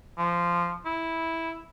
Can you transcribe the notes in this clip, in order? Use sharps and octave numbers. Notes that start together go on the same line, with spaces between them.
F3
E4